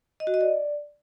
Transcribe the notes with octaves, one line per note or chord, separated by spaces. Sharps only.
D#5
F#4
D#5
D5